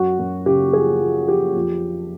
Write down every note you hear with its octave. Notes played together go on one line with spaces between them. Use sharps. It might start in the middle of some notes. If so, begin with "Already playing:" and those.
Already playing: F#2 F#4
F#2
C#3 G4
F3 G#4
F3
F3 G4
F2